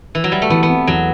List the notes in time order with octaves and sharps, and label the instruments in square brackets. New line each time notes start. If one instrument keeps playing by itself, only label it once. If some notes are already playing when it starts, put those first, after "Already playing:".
[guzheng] E3
F#3
G3
A3
[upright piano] E3 [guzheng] B3
[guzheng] B3
[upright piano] C4
[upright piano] E2 [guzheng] F#3